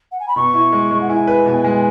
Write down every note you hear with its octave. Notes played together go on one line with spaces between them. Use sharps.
F#5
G#5
B5
B2 C#6
E4
G#3
G#3
F#5
E4 G#5
B4
B2
G#3